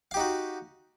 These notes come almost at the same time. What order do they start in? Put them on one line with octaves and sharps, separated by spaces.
F5 G4 D#4 F#4